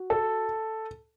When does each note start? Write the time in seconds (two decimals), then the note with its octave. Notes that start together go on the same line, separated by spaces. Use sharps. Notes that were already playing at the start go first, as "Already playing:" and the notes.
Already playing: F#4
0.10 A4